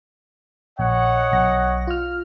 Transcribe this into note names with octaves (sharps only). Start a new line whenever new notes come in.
A#1 C#5 D#5 F#5
B1 A#6
F4 F6